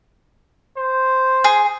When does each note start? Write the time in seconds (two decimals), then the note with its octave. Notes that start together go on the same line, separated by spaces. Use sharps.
0.77 C5
1.44 G#4